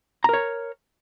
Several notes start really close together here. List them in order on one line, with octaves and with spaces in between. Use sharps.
A#5 A#4 C#5